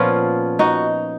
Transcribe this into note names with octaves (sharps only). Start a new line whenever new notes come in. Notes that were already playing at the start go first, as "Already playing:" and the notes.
Already playing: A#2 F3 B3 C#4 F4
D#4 F#4